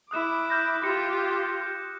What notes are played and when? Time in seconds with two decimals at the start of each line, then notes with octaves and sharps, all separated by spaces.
0.11 E4 D6 D#6 F#6 E7
0.50 F6 G6 A#6
0.83 F4 G4 D6 A#6 C#7